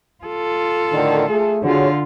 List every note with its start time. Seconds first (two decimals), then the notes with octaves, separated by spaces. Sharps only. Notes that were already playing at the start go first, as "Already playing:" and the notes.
0.24 F4 A4
0.92 A2 D3 D#3
1.28 A3 G#4
1.63 D3 F4 F#4 G#4 C#5